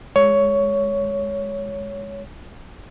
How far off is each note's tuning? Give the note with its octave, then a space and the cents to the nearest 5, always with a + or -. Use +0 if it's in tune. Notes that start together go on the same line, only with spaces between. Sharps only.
G#3 +0 C#5 +10